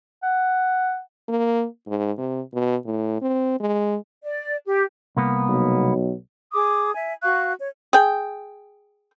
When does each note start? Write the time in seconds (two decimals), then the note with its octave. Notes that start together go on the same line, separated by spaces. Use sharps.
0.23 F#5
1.28 A#3
1.87 G#2
2.18 C3
2.54 B2
2.85 A2
3.21 C4
3.60 G#3
4.23 D5
4.65 G4
5.17 C2 A#3 B3
5.49 B1
6.52 G#4 D6 D#6
6.93 E5 G#5
7.22 F#4 F5 C#6 F#6
7.57 C#5
7.93 G#4 G5